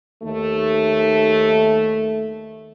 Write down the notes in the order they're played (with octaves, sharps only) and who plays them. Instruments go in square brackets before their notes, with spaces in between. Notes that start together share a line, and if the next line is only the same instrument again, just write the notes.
[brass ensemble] D#2 A3